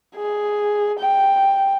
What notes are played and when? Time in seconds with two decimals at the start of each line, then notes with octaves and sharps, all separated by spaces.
0.15 G#4
0.99 G5